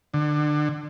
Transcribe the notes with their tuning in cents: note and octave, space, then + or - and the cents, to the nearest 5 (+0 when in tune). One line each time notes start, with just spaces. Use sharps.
D3 +25